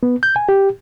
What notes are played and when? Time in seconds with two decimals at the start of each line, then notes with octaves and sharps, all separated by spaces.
0.03 B3
0.23 G6
0.36 G#5
0.49 G4